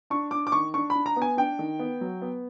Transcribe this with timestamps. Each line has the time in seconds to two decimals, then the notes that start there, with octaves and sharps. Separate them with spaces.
0.10 D4 C#6
0.31 D4 D6
0.47 D6
0.52 D#3 C#6
0.74 D4 C#6
0.90 B5
0.95 D4
1.06 A#5
1.16 B3
1.22 G#5
1.37 D4 G5
1.59 D#3
1.79 B3
2.01 F#3
2.22 B3